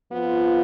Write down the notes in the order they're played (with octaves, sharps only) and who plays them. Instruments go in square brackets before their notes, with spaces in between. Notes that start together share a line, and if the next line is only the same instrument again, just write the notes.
[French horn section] F2 F3 B3 F4